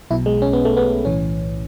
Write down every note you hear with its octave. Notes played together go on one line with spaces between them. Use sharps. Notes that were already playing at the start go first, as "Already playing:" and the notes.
B1 B2 E4
G#3
C#4
B3
A3
B3
B1 A2 E3 C#4